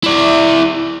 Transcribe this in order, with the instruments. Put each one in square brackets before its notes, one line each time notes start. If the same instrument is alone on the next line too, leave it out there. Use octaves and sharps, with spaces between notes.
[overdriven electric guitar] E4 D5